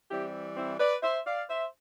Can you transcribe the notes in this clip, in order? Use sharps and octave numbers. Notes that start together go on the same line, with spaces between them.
E3 G3 C4 E4 G4
C4 E4
B4 D5
C5 E5
D5 F5
C5 E5